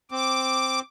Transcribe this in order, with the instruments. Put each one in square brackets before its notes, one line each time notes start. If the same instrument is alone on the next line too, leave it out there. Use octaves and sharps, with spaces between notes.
[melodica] C4 [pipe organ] D6